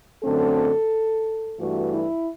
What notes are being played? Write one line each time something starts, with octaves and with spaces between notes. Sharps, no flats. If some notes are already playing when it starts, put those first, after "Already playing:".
F#2 D3 A3 C4 A4
G2 E3 A3 F#4
E4